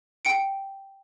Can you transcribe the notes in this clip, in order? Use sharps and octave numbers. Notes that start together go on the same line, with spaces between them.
G5 C#7 D7